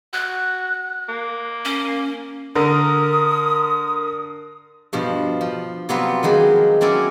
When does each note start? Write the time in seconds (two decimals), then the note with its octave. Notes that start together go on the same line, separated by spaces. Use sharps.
0.13 F#4 F#6
1.09 A#3
1.65 C#4
2.55 D3 A#4 D#6
4.93 G2 B2 F3
5.41 F3
5.89 C3 F#3 G3 B3 F4 B4
6.23 D#3 F3 F#3 G#3
6.81 F#3 C4 C#4 E4 D5